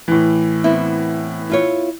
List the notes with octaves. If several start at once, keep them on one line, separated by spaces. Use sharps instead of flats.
A2 E3
B3 C4 E4
E4 F4 C#5